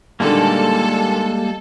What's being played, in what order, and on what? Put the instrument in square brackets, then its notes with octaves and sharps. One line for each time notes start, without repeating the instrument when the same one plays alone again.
[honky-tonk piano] A#2 D3 D#3 [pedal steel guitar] G3 G#3 A#3 [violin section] A4